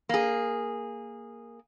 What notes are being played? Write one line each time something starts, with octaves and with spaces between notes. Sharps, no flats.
A#3 G#4